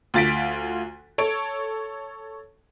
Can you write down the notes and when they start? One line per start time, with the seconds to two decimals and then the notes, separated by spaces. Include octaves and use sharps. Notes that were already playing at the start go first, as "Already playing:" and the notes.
0.14 D2 F4 A6 B6 D7
1.18 A4 C#5 D7